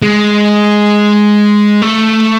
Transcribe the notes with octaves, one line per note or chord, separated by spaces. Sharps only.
G#3
A3